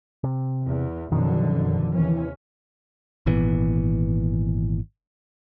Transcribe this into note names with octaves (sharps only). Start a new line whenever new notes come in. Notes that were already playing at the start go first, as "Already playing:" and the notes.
C3
E2
F#1 F#2 B2 D3 D#3 F3
D#2 C3 E3 C#4
G#1 A#2 E3 B3